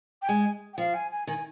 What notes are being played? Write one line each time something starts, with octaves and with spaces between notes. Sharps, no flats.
G5
G#3 G#5
G5
F3 F5
G#5
G#5
D#3 G#5